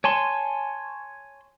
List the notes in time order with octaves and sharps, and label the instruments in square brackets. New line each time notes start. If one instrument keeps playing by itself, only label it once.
[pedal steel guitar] C#5 G#5 A5 C6